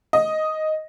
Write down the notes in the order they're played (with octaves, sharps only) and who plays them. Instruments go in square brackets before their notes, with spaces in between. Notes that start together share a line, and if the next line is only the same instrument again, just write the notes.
[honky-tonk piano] D#5